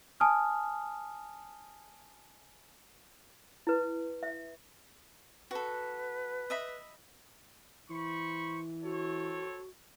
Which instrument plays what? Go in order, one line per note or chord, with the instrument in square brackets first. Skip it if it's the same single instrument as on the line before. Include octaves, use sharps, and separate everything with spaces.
[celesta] G#5 A5 D#6 F6
[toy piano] E4 B4
E5
[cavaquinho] F#4 A4 [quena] B4
[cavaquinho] D#5 E5 B5
[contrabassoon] E3 [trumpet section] C5 B5 C#6
[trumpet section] C4 A4 C#5 [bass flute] F#4